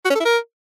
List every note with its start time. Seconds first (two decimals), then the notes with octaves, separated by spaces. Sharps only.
0.05 F#4
0.10 C#4
0.15 A4
0.20 E4
0.25 A#4